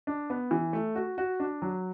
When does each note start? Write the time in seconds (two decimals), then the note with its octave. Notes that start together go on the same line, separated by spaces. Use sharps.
0.07 D4
0.30 B3
0.51 E3
0.73 A3
0.95 F#4
1.18 F#4
1.40 D4
1.62 F#3